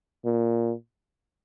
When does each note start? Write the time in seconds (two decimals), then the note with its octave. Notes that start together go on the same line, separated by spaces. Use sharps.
0.25 A#2